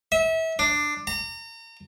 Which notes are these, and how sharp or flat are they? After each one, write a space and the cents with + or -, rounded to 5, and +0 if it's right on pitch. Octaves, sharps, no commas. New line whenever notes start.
E5 -30
D4 +10
A#5 -35